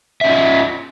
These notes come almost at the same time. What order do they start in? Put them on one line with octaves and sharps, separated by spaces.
E5 C#4 D#5 F4